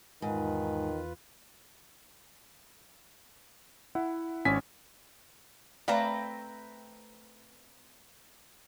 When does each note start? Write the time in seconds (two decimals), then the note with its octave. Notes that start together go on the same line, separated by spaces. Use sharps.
0.22 E2 G#2 D#3 F4 B4
3.95 E4 E5 F#5
4.45 G#1 C#4 C#5 G#5 B6
5.88 A3 C4 B4 D5 E5 F5 G5 A#5